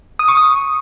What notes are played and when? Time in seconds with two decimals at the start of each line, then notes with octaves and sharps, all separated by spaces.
0.19 D#6
0.28 C#6
0.37 D#6